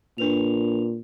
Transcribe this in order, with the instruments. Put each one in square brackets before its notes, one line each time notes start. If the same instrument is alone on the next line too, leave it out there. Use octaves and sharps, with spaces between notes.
[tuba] A#2 [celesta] D4 B4 F7